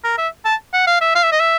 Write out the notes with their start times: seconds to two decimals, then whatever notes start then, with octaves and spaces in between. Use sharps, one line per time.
0.04 A#4
0.18 E5
0.45 A5
0.74 F#5
0.87 F5
1.01 E5
1.15 F5
1.23 E5
1.32 D#5
1.40 E5